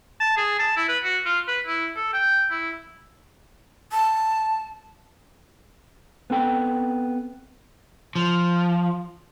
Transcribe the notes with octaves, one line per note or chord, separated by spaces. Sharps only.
A5
G#4
A5
E4
B4
F#4
F4
B4
E4
A4
G5
E4
A5
B3 C4 A4 G5
F3